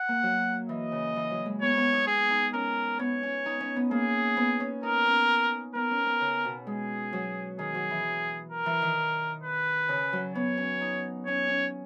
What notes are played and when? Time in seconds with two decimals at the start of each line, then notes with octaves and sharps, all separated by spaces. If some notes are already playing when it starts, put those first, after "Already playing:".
Already playing: F#5
0.08 A#3
0.23 F#3
0.69 E3 D#5
0.92 C#3
1.16 E3
1.31 F#3
1.46 G#3
1.62 B3 C#5
1.77 B3
1.93 D#4
2.07 G#4
2.30 D#4
2.53 C#4 A#4
2.99 B3 C#5
3.23 C#4
3.46 D#4
3.60 C#4
3.76 B3
3.91 A#3 G#4
4.37 B3
4.60 C#4
4.83 D#4 A#4
5.06 C#4
5.75 B3 A#4
5.91 C#4
6.07 B3
6.21 C#3
6.45 B2
6.67 G#3 G#4
7.13 F#3
7.59 D#3 G#4
7.75 F#3
7.90 E3
8.51 A#4
8.66 E3
8.82 D#3
9.43 B4
9.89 C#3
10.13 F#3
10.34 B3 C#5
10.57 C#4
10.81 D#4
11.27 C#4 C#5
11.49 C#4